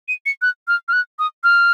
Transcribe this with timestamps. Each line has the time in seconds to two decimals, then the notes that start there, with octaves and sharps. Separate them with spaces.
0.08 D#7
0.26 C#7
0.42 F#6
0.68 F6
0.88 F6
0.93 F#6
1.19 D#6
1.44 F6